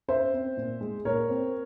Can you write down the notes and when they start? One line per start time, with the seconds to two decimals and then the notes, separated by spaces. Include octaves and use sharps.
0.08 C#4 C5 E5
0.34 C4
0.57 A#2
0.81 G#3
1.05 A#2 A#4 C#5
1.29 C4